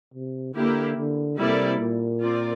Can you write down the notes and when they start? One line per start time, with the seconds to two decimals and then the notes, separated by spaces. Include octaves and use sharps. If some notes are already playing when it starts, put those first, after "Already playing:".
0.15 C3
0.56 D3 A#3 E4 G4
0.97 D3
1.38 C3 G3 A#3 E4 A4 D5
1.80 A#2
2.21 C4 F4 A#4 D5